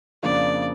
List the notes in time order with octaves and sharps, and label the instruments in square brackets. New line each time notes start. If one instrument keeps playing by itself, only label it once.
[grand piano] F2 C#3 F3 A#3 D4 [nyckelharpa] D5